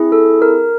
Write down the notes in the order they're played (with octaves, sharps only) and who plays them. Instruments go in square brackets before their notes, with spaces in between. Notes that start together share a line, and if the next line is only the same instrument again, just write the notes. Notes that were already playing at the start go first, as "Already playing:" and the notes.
Already playing: [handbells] C4 E4 G#4
A4
A#4